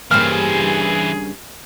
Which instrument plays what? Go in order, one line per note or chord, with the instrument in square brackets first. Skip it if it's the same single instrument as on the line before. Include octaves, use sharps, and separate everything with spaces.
[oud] G2 C#3 A#3 [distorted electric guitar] E3 C5 [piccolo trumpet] G#4 [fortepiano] F6